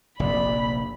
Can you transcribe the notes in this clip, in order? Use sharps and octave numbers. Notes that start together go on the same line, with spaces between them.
F1 A#1 C3 D5 B5